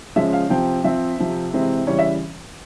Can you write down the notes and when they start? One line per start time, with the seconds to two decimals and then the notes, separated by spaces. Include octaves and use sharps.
0.16 C#3 F3 G#3 C#4 E5
0.33 F5
0.50 C3 F3 C4 G5
0.84 F3 C4 E5
1.18 C3 F3 C4
1.53 C3 E3 G#3 C4
1.87 C#3 E3 G3 C#4 C#5
1.99 E5